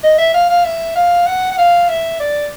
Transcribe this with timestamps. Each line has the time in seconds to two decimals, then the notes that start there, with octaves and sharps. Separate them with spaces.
0.03 D#5
0.18 E5
0.34 F5
0.49 F5
0.64 E5
0.96 F5
1.26 F#5
1.51 F#5
1.57 F5
1.89 E5
2.19 D5